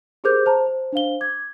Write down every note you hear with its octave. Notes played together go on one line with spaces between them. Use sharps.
G4 G#4 A#4 C5 D6 G6
C5 A5 A#5
C5
D4 C5 F5 G7
D6 G#6